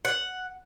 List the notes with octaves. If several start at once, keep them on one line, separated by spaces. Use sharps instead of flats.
F#5